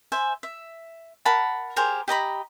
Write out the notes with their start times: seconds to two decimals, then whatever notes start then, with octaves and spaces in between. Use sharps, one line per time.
0.12 C5 E5 G#5
0.43 E5
1.25 A#4 F#5 A5 B5
1.76 G4 G#4 A#4 C5
2.08 G4 D#5 A#5 B5